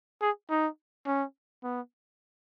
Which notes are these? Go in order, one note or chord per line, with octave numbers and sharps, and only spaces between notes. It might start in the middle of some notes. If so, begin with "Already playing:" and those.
G#4
D#4
C#4
B3